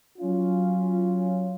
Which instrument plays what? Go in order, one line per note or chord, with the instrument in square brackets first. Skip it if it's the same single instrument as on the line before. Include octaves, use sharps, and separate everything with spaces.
[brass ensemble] F#3 C#4 F4